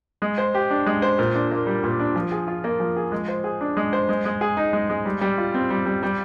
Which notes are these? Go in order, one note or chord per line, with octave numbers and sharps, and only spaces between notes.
G#3
C5
G4
D4
G#3
C5
A#2
D4
A#3
G3
A#2
D4
F3
G#4
F4
A#3
F3
G#4
G#3
C5
G#4
D4
G#3
C5
G#3
G#3
G#4
D#4
G#3
G#3
G3
G3
F4
C4
G3
G3
G3